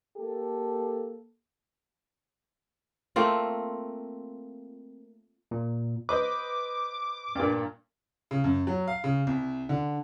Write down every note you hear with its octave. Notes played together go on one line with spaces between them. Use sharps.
A#3 G4 A4
A3 A#3 C4 F4
A#2
B4 C5 D#5 D6
G2 A#2
C#3
F#2
F#3
F5
C#3
C2
D3